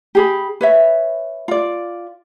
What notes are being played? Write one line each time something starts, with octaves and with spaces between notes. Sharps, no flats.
G4 G#4 B5
B4 C#5 E5
F4 D5